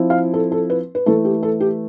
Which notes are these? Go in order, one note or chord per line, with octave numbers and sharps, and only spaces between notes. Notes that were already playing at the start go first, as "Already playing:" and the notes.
Already playing: F3 C4 E4
F5
A4
A4
B4
B4
E3 A3 E4 A4
G4
A4
G4